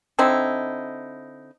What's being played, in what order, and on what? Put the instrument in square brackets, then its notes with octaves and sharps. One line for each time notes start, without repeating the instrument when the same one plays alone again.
[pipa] D3 C4 D#4 E4